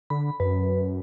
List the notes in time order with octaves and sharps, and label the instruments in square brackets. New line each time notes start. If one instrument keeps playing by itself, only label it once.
[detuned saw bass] D3 [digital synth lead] B5
[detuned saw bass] F#2 [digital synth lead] B4